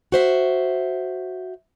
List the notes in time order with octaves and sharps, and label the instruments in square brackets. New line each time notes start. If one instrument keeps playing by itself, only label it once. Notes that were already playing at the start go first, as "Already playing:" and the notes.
[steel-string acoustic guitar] F#4 C5 E5